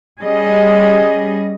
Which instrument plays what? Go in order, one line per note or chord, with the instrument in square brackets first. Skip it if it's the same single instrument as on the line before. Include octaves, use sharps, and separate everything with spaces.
[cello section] G3 C#4 G#4 D#5